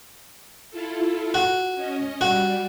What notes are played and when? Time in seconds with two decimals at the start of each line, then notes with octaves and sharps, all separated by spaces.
0.71 E4 F4 A4
1.34 F#4
1.76 C#4 D#5
2.21 G3 F#4